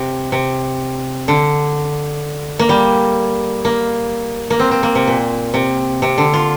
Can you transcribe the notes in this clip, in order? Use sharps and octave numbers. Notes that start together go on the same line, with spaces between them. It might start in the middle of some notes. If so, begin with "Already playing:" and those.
Already playing: C3
C3
D3
A#3
G3
A#3
A#3
C4
C4
A#3
C3
A#2
C3
C3
D3
F4